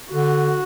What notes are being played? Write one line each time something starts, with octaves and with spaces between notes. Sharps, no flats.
D3 F#4